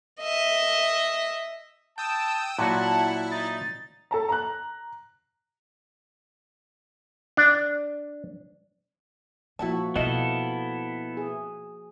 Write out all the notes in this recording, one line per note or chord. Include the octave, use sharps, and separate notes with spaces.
D#5 E5
G5 A5 D#6 E6
A#2 F#3 E4 F#4 F#5 A5
D#4 A6
A4 A5 A#5
A#5 F#6
D4
A#2 F3 A#3 E4 F#4 F#5 A5
B2 B3 E4 A4 D#5 F5
G#4